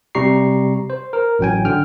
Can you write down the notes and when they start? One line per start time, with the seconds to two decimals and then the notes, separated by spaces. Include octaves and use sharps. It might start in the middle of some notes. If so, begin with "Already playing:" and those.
0.15 C3 G3 G4 A#5 C#6 C7
0.90 C5
1.13 A#4
1.39 A1 F#3 G5 G#5
1.65 D3 G5 F6